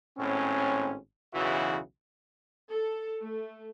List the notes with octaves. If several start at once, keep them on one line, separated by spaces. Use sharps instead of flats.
G#1 A2 C4 C#4
B1 E2 C#3 E3 E4 F#4
A4
A3